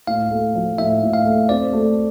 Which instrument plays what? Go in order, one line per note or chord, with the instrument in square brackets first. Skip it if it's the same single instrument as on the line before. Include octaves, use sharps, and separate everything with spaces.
[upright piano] A2 [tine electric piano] F5
[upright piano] A3
F3
[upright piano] A2 [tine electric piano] E5
[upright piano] A2
[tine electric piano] F5
[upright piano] A3
[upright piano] C4 [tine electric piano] D5
[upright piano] A3